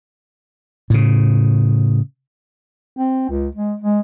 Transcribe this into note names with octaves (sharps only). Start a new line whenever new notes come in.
A2 C#3
C4
C#2
G#3
G#3